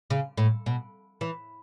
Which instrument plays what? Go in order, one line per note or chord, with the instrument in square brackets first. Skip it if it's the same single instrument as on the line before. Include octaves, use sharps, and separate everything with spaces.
[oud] C#3
A2
B2
E3